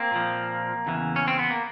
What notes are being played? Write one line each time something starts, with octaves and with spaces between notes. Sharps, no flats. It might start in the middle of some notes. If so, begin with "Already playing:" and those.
Already playing: A#3 C4
A#2 F3
E2 C#3 E3
C#4
C4
B3
A#3